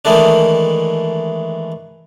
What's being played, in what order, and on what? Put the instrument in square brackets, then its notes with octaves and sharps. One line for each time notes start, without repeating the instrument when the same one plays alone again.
[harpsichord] D#3 E3 G#3 A3 D4